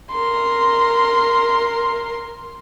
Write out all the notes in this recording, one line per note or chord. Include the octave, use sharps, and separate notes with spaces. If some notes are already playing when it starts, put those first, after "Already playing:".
A#4 C6